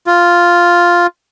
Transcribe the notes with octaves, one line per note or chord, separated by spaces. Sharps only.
F4